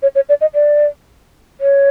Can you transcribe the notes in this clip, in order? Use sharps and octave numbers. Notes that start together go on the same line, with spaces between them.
C#5
C#5
D5
D#5
D5
C#5